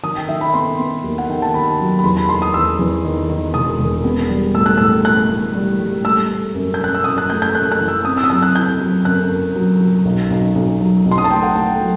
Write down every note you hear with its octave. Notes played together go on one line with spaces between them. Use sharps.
D#3 D#6
G5
D#3 E5
B5
B3 C6
B3
D#2
F#5
D#3 G5
A5
D#3 B5
F#3
B5
E2 C6
B5
D#3 C6
D#6
E2 E6
E2
D#3
D#3
E1 D#6
E1
B3
G3
A2 E6
F#6
A2 E6
A2 F#6
A2
G3
G3
A3 E6
A3
F#2
G6
F#2 F#6
E6
F#2 D#6
F#6
A3 G6
G6
F#2 F#6
F#6
E3
E6
C4 D#6
E6
D#6
F#3 E6
F#6
E4 G6
F#3
F#2 F#6
F#2
F#3
F#3
B1
B1
B1
F#3
B1
C6
D#6
A5
A3 G5
F#5
A3 G5
F#3